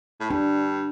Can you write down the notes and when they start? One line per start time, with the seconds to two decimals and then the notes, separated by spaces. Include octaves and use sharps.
0.20 A2
0.30 G2 D4